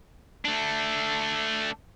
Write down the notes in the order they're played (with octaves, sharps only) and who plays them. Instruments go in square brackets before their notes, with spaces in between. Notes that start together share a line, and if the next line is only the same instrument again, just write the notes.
[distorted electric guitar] A3 D4